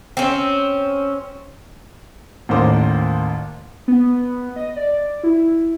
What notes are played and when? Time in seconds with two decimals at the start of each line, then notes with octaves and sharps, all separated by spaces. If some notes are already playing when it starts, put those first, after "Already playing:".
0.17 C4 C#4
2.49 A1 D#2 A#4 C5 D6
3.88 B3
4.56 D#5
4.76 D5
5.23 E4